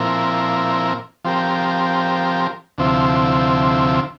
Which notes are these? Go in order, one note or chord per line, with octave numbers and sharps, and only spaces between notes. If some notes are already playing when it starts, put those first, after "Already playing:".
Already playing: A#2 F3 C4 E4 A#4
F3 C4 G4 A#4
D2 C3 F3 C4 E4